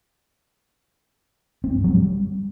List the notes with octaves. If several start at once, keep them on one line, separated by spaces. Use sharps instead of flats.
C4
G2
F#3
G3